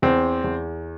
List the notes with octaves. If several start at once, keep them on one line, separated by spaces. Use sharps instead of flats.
E2 C4
E2